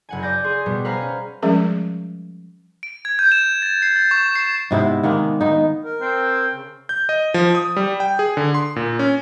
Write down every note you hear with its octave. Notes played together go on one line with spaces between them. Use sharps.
F#1 F#5 G#5
D5 G#5 G6 A#6
G#4 C6
B2 G3 B3
B4 C5 F5 G#5 A#5 F6
C#4
F3 G3 G#3 C#4 G#4 A#4
D7
G#6
G6
E7
A6
C7
A6
C#6
C7
G#2 C3 B3 E4
D#3 G#3 A#3 B3
D#3 B3 D#4
A#4
C4
C#3
G6
D#5
F3
D#6
G3
G5
G#4
D3
C6
A#2
C#4